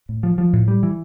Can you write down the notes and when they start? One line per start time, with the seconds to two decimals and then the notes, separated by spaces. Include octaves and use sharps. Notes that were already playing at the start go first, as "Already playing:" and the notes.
0.09 A2
0.23 F3
0.38 F3
0.53 A2
0.68 G3
0.83 E3